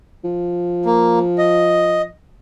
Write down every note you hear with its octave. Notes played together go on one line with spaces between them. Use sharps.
F3
A#3
D#5